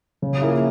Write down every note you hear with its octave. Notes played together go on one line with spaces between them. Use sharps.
C#3
F3 A#3 E4 G#4